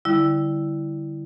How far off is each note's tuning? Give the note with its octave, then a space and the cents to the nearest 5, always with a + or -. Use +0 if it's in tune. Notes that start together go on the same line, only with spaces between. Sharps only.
D3 +0 G3 +0 E4 +0